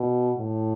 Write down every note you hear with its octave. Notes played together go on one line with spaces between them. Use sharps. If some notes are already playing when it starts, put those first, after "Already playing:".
Already playing: B2
A2